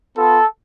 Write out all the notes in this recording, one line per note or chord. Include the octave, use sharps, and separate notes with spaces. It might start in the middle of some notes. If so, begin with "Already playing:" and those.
B3 F4 A4